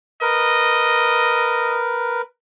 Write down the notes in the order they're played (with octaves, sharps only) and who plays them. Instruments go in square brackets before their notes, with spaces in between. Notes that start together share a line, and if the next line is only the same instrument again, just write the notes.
[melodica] A#4 B4 [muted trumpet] D#5